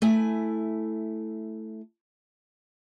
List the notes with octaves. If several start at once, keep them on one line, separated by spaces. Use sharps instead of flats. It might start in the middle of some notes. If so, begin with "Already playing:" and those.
A3 E4 G#5